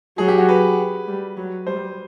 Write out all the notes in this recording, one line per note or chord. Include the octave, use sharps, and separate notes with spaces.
F#3 G#4
G4
F#4
B4
G3
F#3
G3 C5